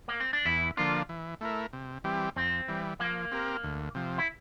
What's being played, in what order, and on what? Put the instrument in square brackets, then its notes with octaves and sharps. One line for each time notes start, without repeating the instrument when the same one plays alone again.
[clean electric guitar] A#3
C4
D4
[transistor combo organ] E2 [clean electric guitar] E4
[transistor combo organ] D3 F3 A#3 D4 [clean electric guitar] F4
[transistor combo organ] E3
A3 E4 A#4
C3
E3 G3 C4 G4
[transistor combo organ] F2 [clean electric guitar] C4
[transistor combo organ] E3 G3
[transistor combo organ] F3 [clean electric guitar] A#3
[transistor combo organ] C4 G4 A#4
D2
C3 F3
[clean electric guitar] E4